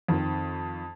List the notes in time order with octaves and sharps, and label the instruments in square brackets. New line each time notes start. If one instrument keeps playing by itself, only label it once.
[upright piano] F2 D#3 C4